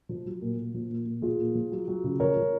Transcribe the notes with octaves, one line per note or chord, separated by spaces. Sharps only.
F3
F#3
A#2
A#2
F3
A#2
A#2
F3 F4 G#4
A#2
F3
F#3
F#3
C#3
F3 A#4 C#5
F3